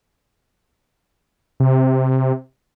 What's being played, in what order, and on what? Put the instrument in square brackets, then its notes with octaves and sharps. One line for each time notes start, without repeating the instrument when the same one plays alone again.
[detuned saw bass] C3